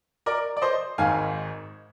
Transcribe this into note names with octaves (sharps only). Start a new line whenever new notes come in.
A#4 D5
D5
C5 D#5
G#1 G#2 D#3 F5 G#5